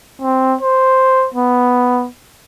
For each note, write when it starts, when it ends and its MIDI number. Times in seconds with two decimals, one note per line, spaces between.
0.22 0.56 60
0.61 1.28 72
1.34 2.07 59